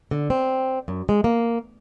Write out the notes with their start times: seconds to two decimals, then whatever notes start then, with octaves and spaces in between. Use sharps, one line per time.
0.11 D3
0.30 C4
0.88 F#2
1.09 G#3
1.24 A#3